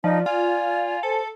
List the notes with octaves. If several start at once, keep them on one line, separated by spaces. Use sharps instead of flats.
F3 D#4 D5
F4 G#5
A4 C5